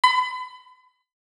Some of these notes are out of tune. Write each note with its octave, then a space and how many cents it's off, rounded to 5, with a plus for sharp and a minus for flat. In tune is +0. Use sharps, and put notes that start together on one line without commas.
B5 +35